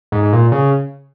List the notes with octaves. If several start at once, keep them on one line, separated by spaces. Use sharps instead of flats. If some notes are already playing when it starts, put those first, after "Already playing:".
G#2
G#2
A#2
C#3